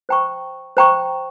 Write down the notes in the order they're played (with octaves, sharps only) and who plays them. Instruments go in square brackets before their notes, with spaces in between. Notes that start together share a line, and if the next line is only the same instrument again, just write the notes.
[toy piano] C5 G5 A#5 C#6
C5 G5 A#5 C#6